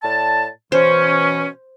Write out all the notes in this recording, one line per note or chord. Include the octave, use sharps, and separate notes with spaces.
A2 D5 A5
B2 E3 C#4 C5